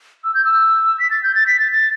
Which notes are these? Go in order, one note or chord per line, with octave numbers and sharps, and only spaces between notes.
E6
G6
E6
B6
A6
G6
A6
B6
A6
A6